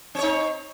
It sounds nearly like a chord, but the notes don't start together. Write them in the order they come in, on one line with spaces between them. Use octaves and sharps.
C4 C#5 D#4